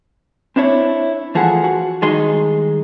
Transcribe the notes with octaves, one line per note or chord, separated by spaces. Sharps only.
C4 D4 E4 C#5
E3 F3 A3 G#4 F#5
F#4
G2 D#3 G#3 D#4 C6